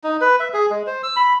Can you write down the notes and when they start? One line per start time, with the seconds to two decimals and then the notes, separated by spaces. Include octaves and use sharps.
0.04 D#4
0.21 B4
0.40 E5
0.54 G#4
0.70 G#3
0.87 C5
1.03 E6
1.16 B5